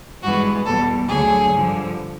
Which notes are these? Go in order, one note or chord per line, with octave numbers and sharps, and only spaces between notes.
G2 E3 G#3 B3 F#4
E2 B2 G3 A4
D2 D3 F#3 G#4
G2 D3 F3